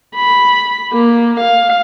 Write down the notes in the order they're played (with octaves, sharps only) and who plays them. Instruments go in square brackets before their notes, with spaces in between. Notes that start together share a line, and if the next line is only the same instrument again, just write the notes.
[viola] B5
A#3
F5